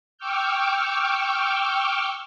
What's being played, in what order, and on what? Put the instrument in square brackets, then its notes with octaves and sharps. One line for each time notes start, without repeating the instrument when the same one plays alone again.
[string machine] G5 C#6 D6 E6 F6 G6